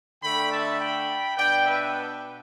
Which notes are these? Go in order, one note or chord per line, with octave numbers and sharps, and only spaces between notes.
D3 A3 D4 G5 B5
E5 A5
G5 B5
B2 B3 D4 D5 G5
B4 E5